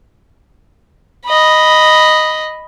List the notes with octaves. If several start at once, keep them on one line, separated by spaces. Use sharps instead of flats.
D#5 B5